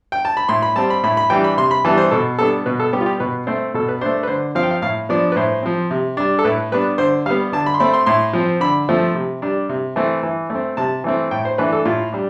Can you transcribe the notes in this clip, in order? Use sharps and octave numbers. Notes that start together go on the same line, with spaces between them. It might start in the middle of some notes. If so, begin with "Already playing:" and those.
G5
A5
B5
A2 C6
B5
G3 C4 A5
B5
A2 B5
B5
E3 G3 D4 G5
B5
C3 C6
B5
E3 G3 B3 D4 A5
C5
B2 A4
G3 B3 D4 A4
B2 B4
A4
G3 B3 G4
F4
G4
B2 B4
A3 C4 C5
B2 A4
B4
A3 D4 C5
B4
D3 C5
F3 C4 F5
G5
F5
A2 F5
F3 B3 D4 D5
B4
A2 C5
F3 C4
C3
G3 D4
A4
A2 B4
G3 B3 D4 B4
D3 C5
G3 B3 F5
D3 A5
B5
C6
A3 C4 B5
C6
A2 C6
F3 C4
D3 B5
F3 A3 C4
C3
G3 D4
C3
E3 A3 C4
E3
A3
C4
C3 A5
E3 A3 C4
A2 G5
C5
E3 A3 D4 B4
A4
A2 F4
G3 D4